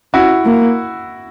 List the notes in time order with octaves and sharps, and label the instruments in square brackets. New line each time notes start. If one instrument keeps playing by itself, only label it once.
[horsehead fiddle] C#4 [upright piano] E4 F#4
[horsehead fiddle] A#3